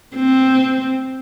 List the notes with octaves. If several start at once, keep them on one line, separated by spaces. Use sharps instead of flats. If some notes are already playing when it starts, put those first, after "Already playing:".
C4